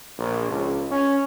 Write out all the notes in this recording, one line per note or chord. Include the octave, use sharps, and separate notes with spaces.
A#1
C#2
C#4